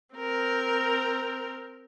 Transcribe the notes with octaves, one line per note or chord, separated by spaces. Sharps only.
C4 A#4